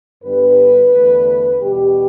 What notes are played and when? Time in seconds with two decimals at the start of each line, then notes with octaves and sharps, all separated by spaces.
0.22 G2 D3 G3 B3 B4
0.92 E2 D3 A3
1.62 E2 B2 G3 G4